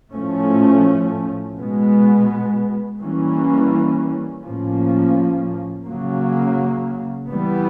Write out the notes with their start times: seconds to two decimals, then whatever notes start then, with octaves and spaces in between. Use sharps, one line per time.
0.12 A2 F3 A3 C#4
1.57 B2 G#3 B3
2.99 E3 G3 A#3 C#4
4.43 A2 F3 A#3 C#4
5.86 C#3 F#3 A#3
7.30 E3 G3 B3